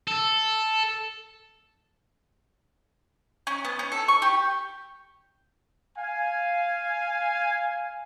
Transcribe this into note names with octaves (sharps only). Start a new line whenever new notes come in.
A4
C#4
B3
C#4
A4
C#6
G4
F5 G#5